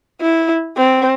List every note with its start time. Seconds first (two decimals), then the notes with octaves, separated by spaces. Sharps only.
0.21 E4
0.77 C4